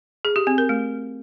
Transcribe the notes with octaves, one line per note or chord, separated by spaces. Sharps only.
G#4
G4
C4
A#4
A3